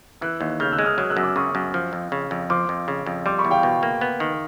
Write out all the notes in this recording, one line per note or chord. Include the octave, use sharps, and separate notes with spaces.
E3 E6 F#6
D#2
C#3 F6 G6
E6 F#6
G#3
D#6 F6
F#3 D#6 F6
E6 F#6
F#2
D6 E6
C#3 C#6 D#6
F#2
F3
F2
C#3
F2
F3 C6 D6
F2
C#3
F2
G3 C6 D6
B5 C#6
E2
F5 G5
B2
A#3
B3
D#3